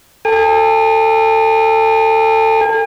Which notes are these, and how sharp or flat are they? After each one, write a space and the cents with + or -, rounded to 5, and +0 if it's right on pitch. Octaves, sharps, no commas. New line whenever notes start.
A4 +20 G#5 -40